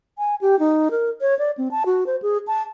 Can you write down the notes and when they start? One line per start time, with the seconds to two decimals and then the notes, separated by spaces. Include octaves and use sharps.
0.18 G#5
0.41 G4
0.59 D#4
0.91 A#4
1.21 C#5
1.39 D5
1.58 C4
1.71 A5
1.86 F#4
2.06 C5
2.22 G#4
2.47 A5